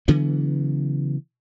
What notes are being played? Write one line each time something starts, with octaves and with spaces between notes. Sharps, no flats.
C#3 E3 F#3 B3